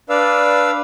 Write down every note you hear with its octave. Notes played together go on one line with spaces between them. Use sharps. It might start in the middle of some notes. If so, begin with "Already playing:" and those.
D4 B4 D5 F5 E6